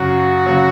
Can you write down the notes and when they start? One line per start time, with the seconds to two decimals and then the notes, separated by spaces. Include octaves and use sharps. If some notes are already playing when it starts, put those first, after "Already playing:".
Already playing: F#2 C#3 F#3 F#4
0.46 C#3 F#3